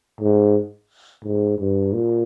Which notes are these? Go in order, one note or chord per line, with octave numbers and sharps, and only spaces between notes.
G#2
G#2
G2
A#2